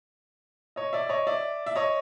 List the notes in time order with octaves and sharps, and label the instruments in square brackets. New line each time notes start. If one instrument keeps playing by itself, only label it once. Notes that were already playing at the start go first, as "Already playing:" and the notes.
[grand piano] C#5 D#5
D5 E5
C#5 D#5
D5 E5
E5
C#5 D#5